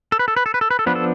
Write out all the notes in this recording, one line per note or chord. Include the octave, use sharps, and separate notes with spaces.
A4
B4
A4
B4
A4
B4
A4
B4
A4
F3 B3 D4 B4
A4